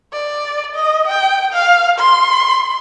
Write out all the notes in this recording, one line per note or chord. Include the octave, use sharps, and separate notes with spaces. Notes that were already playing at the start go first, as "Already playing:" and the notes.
D5
D#5
G5
F5
C6